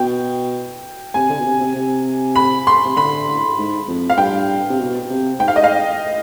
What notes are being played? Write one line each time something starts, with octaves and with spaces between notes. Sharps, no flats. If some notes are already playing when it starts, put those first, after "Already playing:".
Already playing: B2 G5
C3 G#5
D3
B2
C3
C3
C3
B5
C6
C3
D3 B5
G#2
F2
F5
G2 G5
C3
B2
C3
G#2 G5
F5
D#5
F5